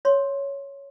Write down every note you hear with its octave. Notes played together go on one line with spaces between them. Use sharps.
C#5 C6